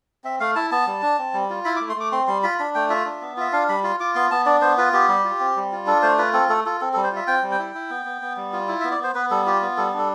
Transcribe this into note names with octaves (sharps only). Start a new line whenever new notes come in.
C4 E5
A3 F5
E4 A5
B3 A5
G3
D4
C4
G3
F4
E4 B5
D6
A3
C6
A3 D6
C4 C6
G3 C6
F4 B5
D4 B5
A3 G5
F4 E5
D4
B3
F4 E5
D4 F5
G3 B5
F4 C6
F4 D6
B3 C6
B3 A5
D4 D5
B3 C5
F4 B4
B3 G4
G3
F4
C4
G3
F4
D4 A4
A3 C5
F4 B4
C4 A4
A3 A4
F4 A4
C4 A4
A4
G3
C5
F4 E5
C4 G5
G3
G5
E4
E4
B3
B3
B3
G3
F4
E4
E5
B3
D5
B3 C5
B3 B4
G3 A4
F4 G4
B3
G3 A4
D4 A4